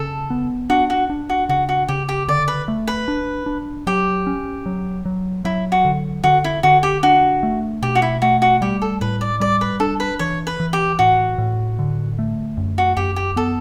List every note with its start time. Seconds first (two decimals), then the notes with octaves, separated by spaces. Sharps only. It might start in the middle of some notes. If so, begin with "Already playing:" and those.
Already playing: C#3 A4
0.30 B3
0.70 D4 F#4
0.90 F#4
1.10 D4
1.29 F#4
1.49 C#3 F#4
1.69 F#4
1.88 C#3 G4
2.09 G4
2.28 D3 D5
2.48 B4
2.68 A3
2.87 B4
3.08 D4
3.46 D4
3.87 F#3 G4
4.27 C#4
4.66 F#3
5.05 F#3
5.45 F#3 E4
5.72 F#4
5.85 D3
6.24 D3 F#4
6.44 E4
6.63 D3 F#4
6.83 G4
7.03 D4 F#4
7.43 A3
7.82 B2 G4
7.95 F#4
8.02 E4
8.22 A3 F#4
8.42 F#4
8.61 G3 G4
8.82 A4
9.01 A2 B4
9.21 D5
9.40 G3 D5
9.61 B4
9.80 D4 A4
10.00 B4
10.19 E3 C#5
10.47 B4
10.60 E3
10.73 G4
10.99 A2 F#4
11.38 A2
11.79 D3
12.19 A3
12.57 F#2
12.78 F#4
12.97 F#2 G4
13.16 G4
13.36 B3 A4